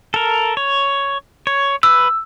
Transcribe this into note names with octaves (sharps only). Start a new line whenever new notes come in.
A4 A#4
C#5
C#5
B4 E6